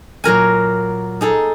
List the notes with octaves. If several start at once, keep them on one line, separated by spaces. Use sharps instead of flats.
A#2 F#3 A#4 G#5
D#4 G#4 A4